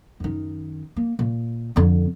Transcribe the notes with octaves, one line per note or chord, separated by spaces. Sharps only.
F#2 D#3
A#3
A#2
F2 D3